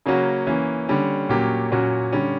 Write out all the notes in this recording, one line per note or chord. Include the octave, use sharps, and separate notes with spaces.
C#3 F#3 A#3 C#4 F#4
E3 A#3 C#4
D3 G3 C#4
A#2 F#3 A#3 C#4 G4
A#2 F#3 C#4 F#4
D3 G3 C#4